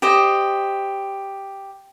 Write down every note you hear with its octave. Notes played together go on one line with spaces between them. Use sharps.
G4 C5 D#5